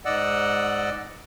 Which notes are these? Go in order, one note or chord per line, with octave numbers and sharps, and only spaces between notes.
G#2 D5 D#5 F#5 E6